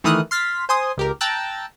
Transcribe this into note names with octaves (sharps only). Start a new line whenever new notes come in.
D#3 E3 A3 D#6 F6 F#6
C6 F6 A6 B6
C5 G#5 C6 D#6
C#2 G4 A#4
G5 A5 A#5 E6 F#6 A6